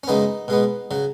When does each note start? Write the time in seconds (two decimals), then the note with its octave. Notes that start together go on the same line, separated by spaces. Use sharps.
0.04 C#4
0.08 F#2 C#3 G#3 B3 D#4
0.48 B2 G#3 B3
0.91 C#3 F#3